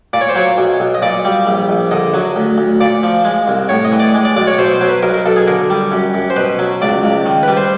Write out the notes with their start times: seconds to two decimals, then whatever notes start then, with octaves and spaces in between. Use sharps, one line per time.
0.13 A#2 D5
0.21 C#5
0.29 C5
0.36 F#3 C#5
0.58 B1
0.80 B1
0.95 D#5
1.02 A#2 D5
1.25 G3
1.47 A#1
1.69 A#1
1.91 D3 D#5
2.14 F#3
2.36 D2
2.58 D2
2.81 A#2 D5
3.03 F3
3.25 G#3
3.48 C2
3.69 A2 C#5
3.85 D#5
3.92 E3
4.00 D5
4.14 G#3
4.25 D5
4.36 B1 D5
4.47 C#5
4.58 B2 C5
4.74 C5
4.81 F#3
4.89 B4
5.03 B1 A#4
5.14 A#4
5.26 B1 A4
5.36 G#4
5.47 D3 A#4
5.70 G3
5.92 F#2
6.14 F#2
6.30 C5
6.36 B2 B4
6.59 F#3
6.82 C#2 D5
7.04 C#2
7.26 D#3
7.43 G3 B4
7.57 C5